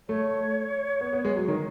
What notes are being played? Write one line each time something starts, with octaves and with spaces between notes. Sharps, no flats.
A3 C#5
B3
B3
G#3
F#3
D#3